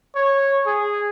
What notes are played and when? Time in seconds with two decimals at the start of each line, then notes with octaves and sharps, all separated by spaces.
0.15 C#5
0.66 G#4